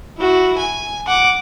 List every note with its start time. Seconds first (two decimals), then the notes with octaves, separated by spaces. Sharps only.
0.17 E4 F#4
0.58 G#5
1.07 F#5 D6